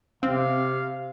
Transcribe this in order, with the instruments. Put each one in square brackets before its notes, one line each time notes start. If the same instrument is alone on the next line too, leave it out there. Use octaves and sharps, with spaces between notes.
[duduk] C3 [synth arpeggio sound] C4 [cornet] F5